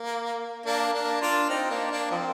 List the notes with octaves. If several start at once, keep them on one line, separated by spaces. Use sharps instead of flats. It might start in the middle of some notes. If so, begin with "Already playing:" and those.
Already playing: A#3
A#3 D4
A#3 D4
D4 F4
C4 D#4
A#3 D4
A#3 D4
F3 C4